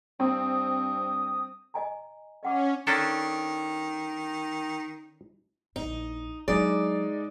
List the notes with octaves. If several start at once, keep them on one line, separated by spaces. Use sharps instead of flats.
G2 C4 D#6
D#5 G#5 A#5
C#4 D#5 F#5 D6
D#3 C#4 D4 A4
A#1 D#4 E4
F#3 G#3 D4 D#4 D5